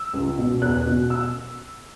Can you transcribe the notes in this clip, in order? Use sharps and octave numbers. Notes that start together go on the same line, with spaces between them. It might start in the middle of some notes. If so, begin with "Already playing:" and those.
Already playing: E6
C#2
B2
E2 F#6
B2
E6